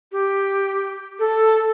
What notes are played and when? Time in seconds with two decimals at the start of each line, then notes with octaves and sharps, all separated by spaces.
0.12 G4
1.19 A4